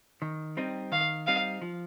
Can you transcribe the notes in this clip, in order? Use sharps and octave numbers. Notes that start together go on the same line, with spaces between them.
D#3
G3 C4 D#4
D#3 F5
G3 C4 D#4 F5
F3